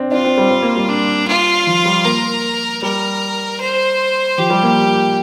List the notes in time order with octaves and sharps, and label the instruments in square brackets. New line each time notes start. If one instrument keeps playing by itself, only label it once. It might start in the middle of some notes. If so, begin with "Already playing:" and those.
Already playing: [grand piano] C4 D4
[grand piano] D4 [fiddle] F4
[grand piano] C4
G3
G3
A#3
G3
[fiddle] D4
F4
[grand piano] F3
G3
[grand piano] A#3 [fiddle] A#4
[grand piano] G3 [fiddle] A#4
[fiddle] C5
[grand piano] F3 [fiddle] G4
[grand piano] G3
A#3